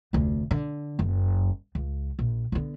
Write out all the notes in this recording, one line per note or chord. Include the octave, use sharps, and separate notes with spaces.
F1 D2
D3
F#1 F#2
C#2
A#1
D3 B3